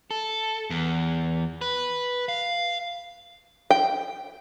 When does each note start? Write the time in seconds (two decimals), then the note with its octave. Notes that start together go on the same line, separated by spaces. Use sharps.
0.11 A4
0.70 E2
1.61 B4
2.29 F5
3.70 G5